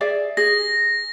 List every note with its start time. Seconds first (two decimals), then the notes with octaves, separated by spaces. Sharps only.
0.01 G#4 D5 E5
0.37 G#4 A#6